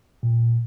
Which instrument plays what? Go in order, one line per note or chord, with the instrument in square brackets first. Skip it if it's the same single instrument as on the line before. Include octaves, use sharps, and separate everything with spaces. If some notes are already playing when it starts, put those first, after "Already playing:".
[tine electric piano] A#2